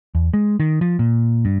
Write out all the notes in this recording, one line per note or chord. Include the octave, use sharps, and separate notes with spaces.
E2
G#3
D#3
F3
A#2
G2